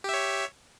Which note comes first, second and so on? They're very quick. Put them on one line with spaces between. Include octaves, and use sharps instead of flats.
G4 E5 C#5